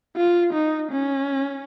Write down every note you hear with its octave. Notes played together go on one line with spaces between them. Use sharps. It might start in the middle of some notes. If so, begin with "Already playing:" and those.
F4
D#4
C#4